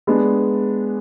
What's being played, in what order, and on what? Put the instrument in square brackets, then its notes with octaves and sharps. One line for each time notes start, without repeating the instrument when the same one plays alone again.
[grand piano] G#3 B3 D4